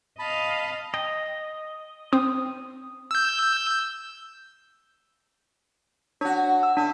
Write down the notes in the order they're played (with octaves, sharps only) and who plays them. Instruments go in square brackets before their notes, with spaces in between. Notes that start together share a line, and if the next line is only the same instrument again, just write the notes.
[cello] D#5 F5 [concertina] A5 B5
[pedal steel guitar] D#5 [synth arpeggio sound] G5
[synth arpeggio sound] C4 [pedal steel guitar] D#6
[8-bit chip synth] E6 G6
[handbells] D4 [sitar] F#4 C#5
[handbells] E6
[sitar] A2 C#4 [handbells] D4